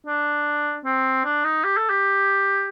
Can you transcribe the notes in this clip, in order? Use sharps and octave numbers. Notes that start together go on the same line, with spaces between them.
D4
C4
D4
D#4
G4
A4
G4